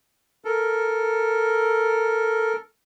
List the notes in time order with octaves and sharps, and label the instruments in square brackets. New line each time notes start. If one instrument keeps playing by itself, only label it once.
[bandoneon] A4 A#4